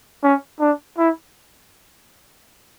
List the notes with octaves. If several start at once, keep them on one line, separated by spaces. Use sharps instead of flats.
C#4
D4
E4